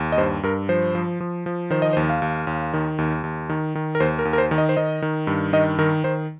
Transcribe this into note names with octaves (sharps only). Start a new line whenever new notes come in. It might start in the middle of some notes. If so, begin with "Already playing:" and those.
Already playing: D#2
D#5
G2 C5
G2 A#4
F3 C5
F3
F3
F3
D#3 C5
D#5
C5
D#2
F5
D#2
D#2
D#3
D#2
D#2
D#3
D#3
A#4
D#2 C5
A#4
D#2
A#4
C5
D#3
D#5
C5
D#3 D#5
D#3
G2
D#3 D#5
D#3 A#4
D#3 C5